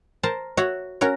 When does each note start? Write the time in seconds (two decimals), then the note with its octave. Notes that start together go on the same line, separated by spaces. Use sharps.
0.23 A#4 C5 A5
0.57 F#4 C#5 E5 F#5
1.01 C#4 F#4 A#4 C#5